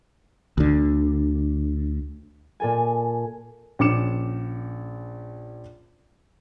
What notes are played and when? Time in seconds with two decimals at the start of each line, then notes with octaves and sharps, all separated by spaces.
0.58 D2 D3
2.60 A#2 A4 G#5
3.79 A#1 C#4 D6 C#7 E7